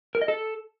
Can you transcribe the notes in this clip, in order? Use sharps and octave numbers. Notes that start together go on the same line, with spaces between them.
A#4
D#5
A4